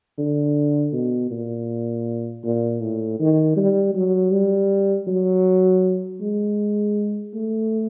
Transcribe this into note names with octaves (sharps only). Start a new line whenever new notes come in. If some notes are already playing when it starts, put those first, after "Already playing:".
D3
B2
A#2
A#2
A2
D#3
G3
F#3
G3
F#3
G#3
A3